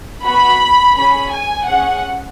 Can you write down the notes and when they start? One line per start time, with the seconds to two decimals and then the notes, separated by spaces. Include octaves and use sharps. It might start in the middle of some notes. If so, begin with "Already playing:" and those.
0.25 B3 F#4 B5
0.97 C#4 G#4 B5
1.33 G#5
1.68 C#4 G#4 F#5